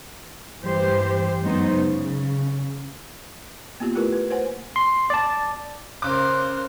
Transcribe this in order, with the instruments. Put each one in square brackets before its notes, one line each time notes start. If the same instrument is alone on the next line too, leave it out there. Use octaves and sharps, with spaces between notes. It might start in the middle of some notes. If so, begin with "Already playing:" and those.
[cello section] G2 E3 G3 G4 C5
F#2 F#3 G#3 B3 D#4 C5
C#3
[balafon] A#3 B3 F4 G4
A3 E4 F4 G4 A#4 B4
B4
B4 C5 F#5 G#5
[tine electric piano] C6
D5 A5
[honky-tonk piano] C#3 D6 [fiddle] A#4 C5 [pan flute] F#6